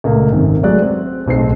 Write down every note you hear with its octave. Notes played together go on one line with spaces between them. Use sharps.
C#2 A#2 A3 A#3
G#1 F#2 C3 D#3
F#3 G#3 A3 D5 F#6
C4
D1 B1 C4 C7